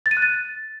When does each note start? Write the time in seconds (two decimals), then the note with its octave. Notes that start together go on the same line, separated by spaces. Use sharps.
0.06 A6
0.11 D#7
0.17 F#6
0.22 A6